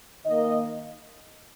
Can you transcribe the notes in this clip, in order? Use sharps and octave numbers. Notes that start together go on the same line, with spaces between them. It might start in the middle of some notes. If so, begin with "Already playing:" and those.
D#3 A#3 D#5